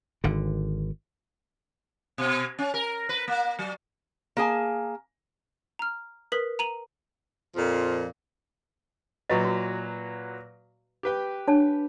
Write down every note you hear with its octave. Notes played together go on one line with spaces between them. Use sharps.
G#1 D3
B2
C#4
A#4
B4
A#3
F#3
A#3 G#4 G#5 A5
A#5 F6
A#4 B4 D#6 B6 F#7
A#5 D#7 F#7
F2 A#2 F3
A#2 F#3 B4 D#5 C#6
F#4
G4 B4 G5
D4 C#5 A5